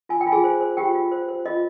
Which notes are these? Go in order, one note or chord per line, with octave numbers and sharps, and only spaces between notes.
F4 G#5
G5
F4
G#4 G#5
C5
C5
F4 G4 G5
F4
C5
C5
F4 D#5